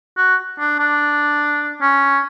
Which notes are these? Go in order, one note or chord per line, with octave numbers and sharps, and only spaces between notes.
F#4
D4
D4
C#4